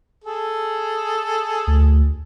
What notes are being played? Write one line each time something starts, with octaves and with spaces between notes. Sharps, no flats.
G#4 A4
D2